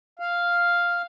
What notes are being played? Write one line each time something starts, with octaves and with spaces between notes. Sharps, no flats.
F5